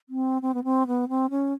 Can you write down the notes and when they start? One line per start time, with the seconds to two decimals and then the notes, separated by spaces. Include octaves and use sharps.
0.09 C4
0.42 C4
0.54 B3
0.64 C4
0.87 B3
1.09 C4
1.30 C#4